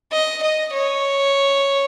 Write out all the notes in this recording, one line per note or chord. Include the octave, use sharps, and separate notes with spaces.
D#5
D#5
C#5